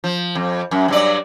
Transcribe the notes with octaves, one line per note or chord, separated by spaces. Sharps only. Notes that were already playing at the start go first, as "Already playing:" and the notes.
F3
F2
F#2
G2 F#3 D5